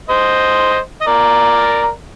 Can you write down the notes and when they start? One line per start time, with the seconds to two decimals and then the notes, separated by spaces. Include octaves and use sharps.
0.09 C5 D#5
1.01 D#5
1.07 A#4 D5